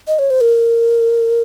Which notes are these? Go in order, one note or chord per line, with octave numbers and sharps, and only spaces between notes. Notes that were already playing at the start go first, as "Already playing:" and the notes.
D#5
C#5
C5
A#4